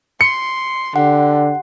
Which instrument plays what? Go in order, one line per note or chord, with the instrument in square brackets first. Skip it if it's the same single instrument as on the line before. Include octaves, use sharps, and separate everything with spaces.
[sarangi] C6 [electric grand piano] C#7
[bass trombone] D3 [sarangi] G4 [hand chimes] F#5